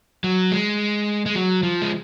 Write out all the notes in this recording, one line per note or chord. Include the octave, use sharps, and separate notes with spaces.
F#3
G#3
G#3
F#3
F3
G#3